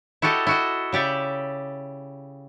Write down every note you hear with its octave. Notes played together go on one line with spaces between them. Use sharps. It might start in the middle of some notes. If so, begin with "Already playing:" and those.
E4 F#4 G4 A4 D#5
E4 F#4 D#5
C#3 G4 D5 E5